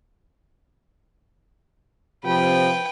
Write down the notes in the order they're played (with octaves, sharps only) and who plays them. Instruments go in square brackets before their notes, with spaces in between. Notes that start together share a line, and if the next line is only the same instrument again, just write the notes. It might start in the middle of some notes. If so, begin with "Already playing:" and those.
[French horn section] C3 F3 [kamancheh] B4 G5